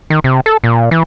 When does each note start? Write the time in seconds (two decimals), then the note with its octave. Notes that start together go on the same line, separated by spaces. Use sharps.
0.10 D#3
0.24 C3
0.46 A4
0.64 A#2
0.91 E3